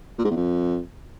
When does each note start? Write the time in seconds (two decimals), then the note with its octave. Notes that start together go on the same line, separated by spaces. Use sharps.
0.18 A#2
0.24 G#2
0.30 E2
0.36 F2